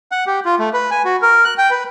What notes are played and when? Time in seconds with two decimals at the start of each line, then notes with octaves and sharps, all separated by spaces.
0.12 F#5
0.27 G4
0.45 F4
0.59 A3
0.73 B4
0.91 G#5
1.05 F#4
1.22 A#4
1.45 F#6
1.58 G5
1.71 B4